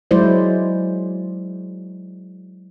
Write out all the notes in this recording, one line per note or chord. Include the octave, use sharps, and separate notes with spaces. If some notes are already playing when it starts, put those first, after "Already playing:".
F#3 G#3 E4 C5 D5